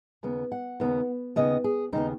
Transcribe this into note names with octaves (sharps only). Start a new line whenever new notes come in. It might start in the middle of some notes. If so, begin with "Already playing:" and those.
D#2 C#3 B3
F#5
D#2 C#3 B3
D#2 C#3 B3 D#5
G#4
D#2 C#3 B3 D#4